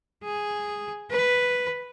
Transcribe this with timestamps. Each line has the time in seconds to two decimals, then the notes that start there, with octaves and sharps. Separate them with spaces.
0.24 G#4
1.11 B4